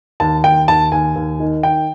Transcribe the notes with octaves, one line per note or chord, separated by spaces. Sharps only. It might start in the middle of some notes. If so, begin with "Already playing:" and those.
D#2 A5
D#2 G5
D#2 A5
D#2 G#5
D#2
D#3
D#3 G5